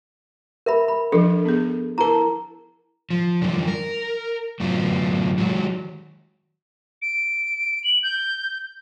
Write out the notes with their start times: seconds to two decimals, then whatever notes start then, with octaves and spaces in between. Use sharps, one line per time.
0.66 A#4 E5 B5
0.88 B5
1.12 F3 D4 A4
1.45 B3 G#4
1.98 E4 A#4 A5 A#5
3.10 F3
3.41 F#2 D3 E3 F3 G3
3.67 A#4
4.60 F#2 A2 D3 F#3 B3 F4
5.38 D#3 F#3 G#3 F#4
7.02 D7
7.84 F#7
8.03 G6